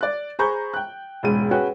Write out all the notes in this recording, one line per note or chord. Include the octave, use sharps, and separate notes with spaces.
D5 F#6
G#4 C5 A#5 B5 C#6 G6
G5 F#6
E1 C#2 G#2 D#7
C#4 F#4 G#4 B4 G5